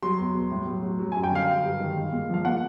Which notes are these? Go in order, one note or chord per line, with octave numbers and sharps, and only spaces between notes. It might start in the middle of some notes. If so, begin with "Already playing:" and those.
F#3 C6
E2
B2
A2
F#3
F#3
F#3
G#5
F#2
G5
D3 F5
F#3
G2
D#3
G#3
A#2
F3 F5
A#2 F#5